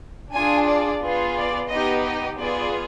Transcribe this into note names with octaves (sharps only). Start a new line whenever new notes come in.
D4 F4 G#4 G#5
D5
B3 F4 G#4
D5
B3 D#4 G4 D#5
D#5
B3 F4 G#4 D5